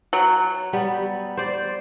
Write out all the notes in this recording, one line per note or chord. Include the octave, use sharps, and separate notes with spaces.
F#3
G3 B3
C5 D5